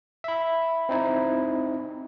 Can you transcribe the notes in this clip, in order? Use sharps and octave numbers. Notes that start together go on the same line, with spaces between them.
E5 B5
C4 D#4 E4